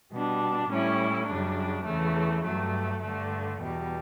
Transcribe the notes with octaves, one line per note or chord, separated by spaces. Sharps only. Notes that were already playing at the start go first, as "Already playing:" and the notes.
B2 G3 D4
A2 G3 C#4 E4
F#2 C#3 G3 D4
E2 C#3 E3 A3
G2 F#3 A3
G2 D3 A3
E2 B2 G3